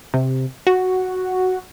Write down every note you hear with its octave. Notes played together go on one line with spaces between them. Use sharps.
C3
F#4